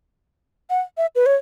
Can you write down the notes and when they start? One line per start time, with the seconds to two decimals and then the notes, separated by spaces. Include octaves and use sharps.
0.70 F#5
0.98 E5
1.15 B4
1.26 C#5